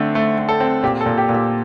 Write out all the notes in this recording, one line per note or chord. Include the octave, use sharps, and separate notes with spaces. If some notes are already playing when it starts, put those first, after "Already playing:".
Already playing: D3 A3 C4
A3
A3
A4
C4
A#2 G4
A4
A#2
G4
A#2
G4